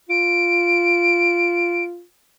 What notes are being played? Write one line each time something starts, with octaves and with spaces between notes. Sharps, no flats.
F4 D7